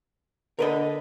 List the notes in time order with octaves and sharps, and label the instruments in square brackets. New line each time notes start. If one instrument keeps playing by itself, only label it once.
[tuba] D3 [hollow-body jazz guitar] A#4 B4 D#5